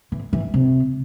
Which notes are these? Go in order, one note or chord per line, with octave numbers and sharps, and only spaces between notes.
E3
E3
C3